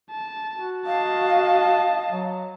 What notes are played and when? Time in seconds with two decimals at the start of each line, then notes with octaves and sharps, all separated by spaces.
0.11 A5
0.54 F#4
0.86 D#5 F5 A5
2.12 F#3